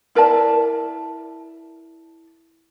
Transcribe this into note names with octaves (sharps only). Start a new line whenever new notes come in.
E4 A#4 D5 A5